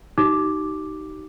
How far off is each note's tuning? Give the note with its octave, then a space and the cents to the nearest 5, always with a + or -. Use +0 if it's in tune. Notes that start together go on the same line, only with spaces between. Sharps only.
D#4 +0 G4 -35 D6 +0